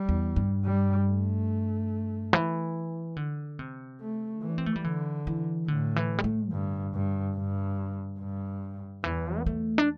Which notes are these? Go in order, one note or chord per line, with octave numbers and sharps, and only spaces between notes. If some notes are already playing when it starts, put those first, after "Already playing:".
Already playing: G3
E2
G2
G3
A3
E3
D3
C3
A3
E3
D4
C4
A3
G3
D3 E3
E3
A2 D3
E3
G3
A3
G2 D3
G2
G2
G2
E2 E3
C4
A3
D4